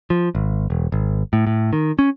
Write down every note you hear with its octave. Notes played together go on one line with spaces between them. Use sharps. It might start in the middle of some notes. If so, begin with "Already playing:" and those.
F3
G#1
E1
G#1
A2
A2
D#3
C#4